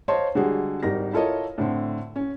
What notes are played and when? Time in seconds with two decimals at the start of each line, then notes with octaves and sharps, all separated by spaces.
0.08 C5 C#5 D#5 F5 A5 C6
0.35 D3 G3 G#3 F#4 G#4
0.83 G#1 G3 D#4 A#4 A#6
1.13 E4 F4 A4 A#4 C#5 D#5
1.58 A2 D3 C4
2.16 C#4